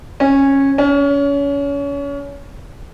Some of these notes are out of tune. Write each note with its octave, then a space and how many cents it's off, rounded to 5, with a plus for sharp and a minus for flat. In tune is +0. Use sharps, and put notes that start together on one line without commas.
C#4 -15
C#4 +30